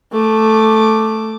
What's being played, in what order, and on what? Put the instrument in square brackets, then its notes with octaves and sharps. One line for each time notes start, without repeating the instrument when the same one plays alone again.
[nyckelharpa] A3 D6